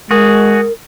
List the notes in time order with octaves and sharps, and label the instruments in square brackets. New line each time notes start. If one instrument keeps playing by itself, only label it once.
[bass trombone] G#3 [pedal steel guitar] F#4 G#4 [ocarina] A#4